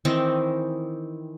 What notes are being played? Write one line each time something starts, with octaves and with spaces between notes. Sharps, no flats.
D#3 E3 C4 D#4